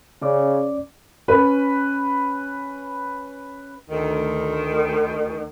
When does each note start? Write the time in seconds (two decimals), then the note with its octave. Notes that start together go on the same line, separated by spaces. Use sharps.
0.22 C#3 C#4 D5 D6
1.28 C#4 B4
3.90 D2 D#3